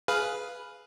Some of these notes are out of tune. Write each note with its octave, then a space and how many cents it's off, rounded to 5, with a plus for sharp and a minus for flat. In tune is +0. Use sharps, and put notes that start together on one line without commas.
G#4 +15 B4 +0 F5 +0